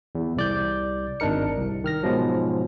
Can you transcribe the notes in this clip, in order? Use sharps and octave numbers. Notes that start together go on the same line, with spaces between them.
E2
C2 D5 G6
G#1 D4 D#4 A#4 C#7
C2
D#3 F6 A#6
G#2 B2 F3 F#3